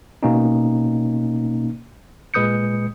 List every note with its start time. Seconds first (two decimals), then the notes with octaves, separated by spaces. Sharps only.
0.23 B2 A#3 C#4 D#4
2.34 A#2 G#3 B4 D#6 G6 C#7